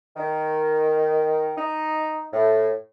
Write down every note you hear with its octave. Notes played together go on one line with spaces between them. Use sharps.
D#3
D#4
A2